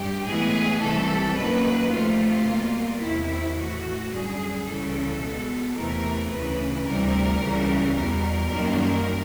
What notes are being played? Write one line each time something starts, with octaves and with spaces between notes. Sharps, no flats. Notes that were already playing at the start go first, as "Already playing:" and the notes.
Already playing: G2 G4
A2 E3 G#3 B3 G#4
C2 C3 E3 A3 A4
F#2 D#3 F#3 A#3 B4
D2 C3 F3 A3 F4
B2 G3 A#3
E2 C3 D#3 E4
A2 E3 A3 F#4
F#2 D3 G3 G#4
C#2 C#3 E3 G3 A4
B2 G#3 B3
E2 C3 E3 A3 A#4
D2 C#3 E3 B4
D2 C3 E3 G3 A#4
C#2 C#3 E3 G3
E2 B2 G3 A#4
F#2 D#3 G3 A#3